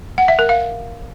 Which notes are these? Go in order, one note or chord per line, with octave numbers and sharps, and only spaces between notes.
F#5
E5
A#4
F5